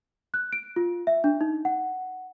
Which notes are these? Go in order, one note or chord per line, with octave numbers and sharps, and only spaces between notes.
F#6
D7
F4
E5
D4
D#4
F#5